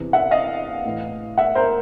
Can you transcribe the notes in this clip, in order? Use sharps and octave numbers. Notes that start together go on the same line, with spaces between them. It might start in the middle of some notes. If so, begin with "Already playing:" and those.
Already playing: E2 C3 E3
E5 F#5
D#5 F5
A2 E3
E5 F#5
A#4 C5